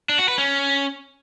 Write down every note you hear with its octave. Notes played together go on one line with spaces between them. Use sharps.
D4
F#4
B4
C#4